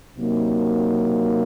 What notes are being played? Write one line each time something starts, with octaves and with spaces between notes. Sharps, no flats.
C3 F#3 A#3 D#4